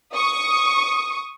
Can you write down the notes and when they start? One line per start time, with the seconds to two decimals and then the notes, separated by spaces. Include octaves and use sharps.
0.15 C#6 D#6